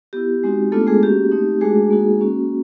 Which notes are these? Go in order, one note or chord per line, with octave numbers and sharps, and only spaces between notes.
B3 E4 G4
G#3 C4 D#4 F#4
A3 B3 D4 F4 A4
G#3 G#4
A#3 C#4 F#4 G4
A3 C4 D#4
G#3 A3 D4 F#4 G#4
A#3 D#4 F#4
A#3 C#4 F#4